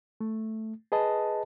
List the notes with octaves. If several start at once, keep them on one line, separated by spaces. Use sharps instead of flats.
A3
G#4 B4 D#5 A5